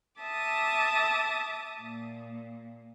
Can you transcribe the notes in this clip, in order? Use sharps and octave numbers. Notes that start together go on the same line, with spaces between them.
E5 A5 D6 D#6
A#2